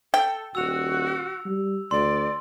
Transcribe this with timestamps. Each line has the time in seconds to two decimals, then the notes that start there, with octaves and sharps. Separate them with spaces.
0.14 A4 G5
0.55 D#1 F#4 E6 F7
1.45 G3
1.91 D2 D5 C6